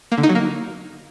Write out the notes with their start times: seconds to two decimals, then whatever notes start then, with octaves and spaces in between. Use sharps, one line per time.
0.12 A#3
0.17 D3
0.23 D#4
0.29 F#3
0.35 A#3